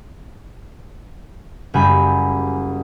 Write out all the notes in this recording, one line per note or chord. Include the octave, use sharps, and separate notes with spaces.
F#1 G3 G#5 B5 G6